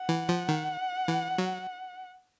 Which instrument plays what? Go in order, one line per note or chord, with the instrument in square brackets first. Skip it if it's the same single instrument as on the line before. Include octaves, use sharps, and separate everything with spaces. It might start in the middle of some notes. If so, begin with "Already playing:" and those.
Already playing: [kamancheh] F#5
[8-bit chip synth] E3
F3
D#3
E3
F#3